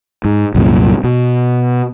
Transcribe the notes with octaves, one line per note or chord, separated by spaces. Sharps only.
G#2
C2 F#2 A#2
B2